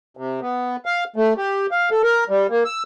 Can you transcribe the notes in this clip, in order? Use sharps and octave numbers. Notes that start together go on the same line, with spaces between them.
C3
B3
F5
A3
G4
F5
A4
A#4
G3
A#3
E6